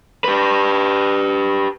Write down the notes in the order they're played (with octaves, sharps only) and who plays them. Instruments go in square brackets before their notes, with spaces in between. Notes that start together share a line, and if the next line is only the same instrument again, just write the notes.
[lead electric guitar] G4 B4